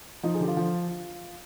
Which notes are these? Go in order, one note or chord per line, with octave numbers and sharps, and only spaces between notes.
F3 D#4
G#4
D3 G4
F4
F3